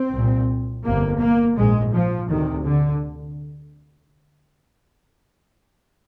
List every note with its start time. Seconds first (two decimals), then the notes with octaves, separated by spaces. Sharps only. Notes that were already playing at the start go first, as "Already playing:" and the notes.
Already playing: C4
0.12 C2 A#2
0.84 G1 F2 C3 A#3
1.19 A#3
1.56 A#1 G#2 G#3
1.93 F3
2.29 D2 C3 D#3
2.65 D3